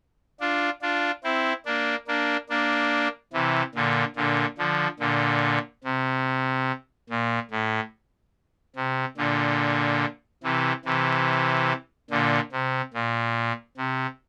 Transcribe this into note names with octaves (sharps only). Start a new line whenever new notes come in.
D4 F4
D4 F4
C4 E4
A#3 D4
A#3 D4
A#3 D4
C3 E3
A#2 D3
A#2 D3
D3 F3
A#2 D3
C3
A#2
A2
C3
A#2 D3
C3 E3
C3 E3
A#2 D3
C3
A#2
C3